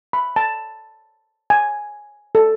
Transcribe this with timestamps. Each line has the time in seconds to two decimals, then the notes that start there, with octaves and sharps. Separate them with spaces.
0.13 B5
0.36 A5
1.50 G#5
2.35 A4